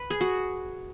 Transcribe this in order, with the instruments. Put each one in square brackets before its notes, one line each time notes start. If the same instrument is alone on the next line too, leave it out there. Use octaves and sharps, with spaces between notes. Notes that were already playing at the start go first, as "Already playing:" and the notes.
Already playing: [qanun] B4
G#4
F#4